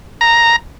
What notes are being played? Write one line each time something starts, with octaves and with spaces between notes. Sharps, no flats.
A#5